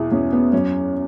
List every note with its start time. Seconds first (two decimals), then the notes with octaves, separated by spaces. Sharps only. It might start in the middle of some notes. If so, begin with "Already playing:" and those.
Already playing: E2 B2 E4 G#4
0.12 E2 C#4
0.33 B3
0.53 F#2 C#4